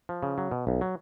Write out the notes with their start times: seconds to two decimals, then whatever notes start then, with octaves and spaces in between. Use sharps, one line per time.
0.09 F3
0.23 C#3
0.38 F#3
0.51 B2
0.67 B1
0.81 F#3